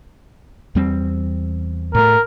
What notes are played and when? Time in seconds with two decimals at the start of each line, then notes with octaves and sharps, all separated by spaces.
0.75 E2 G3 C4
1.95 A2 A3 A#4